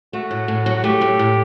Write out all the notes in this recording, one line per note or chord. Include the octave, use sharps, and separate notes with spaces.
A3 F#4
A2
A2
F#3
F#4
A3 G4
A2
A2